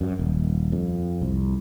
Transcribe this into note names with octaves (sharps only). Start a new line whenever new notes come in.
F#2
D#1
F2
C2